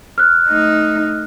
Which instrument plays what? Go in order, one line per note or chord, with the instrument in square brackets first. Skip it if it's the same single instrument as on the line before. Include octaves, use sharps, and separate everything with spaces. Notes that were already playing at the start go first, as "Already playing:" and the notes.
[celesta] F6 F#6
[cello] A3 D#4